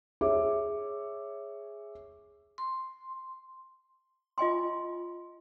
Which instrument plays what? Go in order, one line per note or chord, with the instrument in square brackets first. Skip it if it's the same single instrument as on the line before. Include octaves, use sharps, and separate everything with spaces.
[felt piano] G#4 C#5 E5 D6
[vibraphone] C6
[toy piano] F4 D#5 G#5 C6